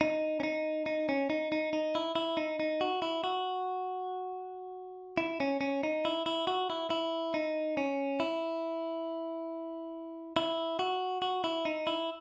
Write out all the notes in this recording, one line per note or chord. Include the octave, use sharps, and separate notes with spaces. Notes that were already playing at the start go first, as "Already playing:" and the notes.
D#4
C#4
D#4
D#4
C#4
D#4
D#4
D#4
E4
E4
D#4
D#4
F#4
E4
F#4
E4
C#4
C#4
D#4
E4
E4
F#4
E4
E4
D#4
C#4
E4
E4
F#4
F#4
E4
D#4
E4